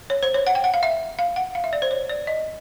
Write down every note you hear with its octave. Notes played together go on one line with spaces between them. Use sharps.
C#5
C5
C#5
F#5
G5
F#5
F5
E5
F5
F#5
F5
E5
D5
C5
C#5
D5
D#5